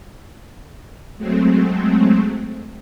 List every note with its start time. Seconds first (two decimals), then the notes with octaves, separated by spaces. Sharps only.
1.17 F#3 G#3 A3 C4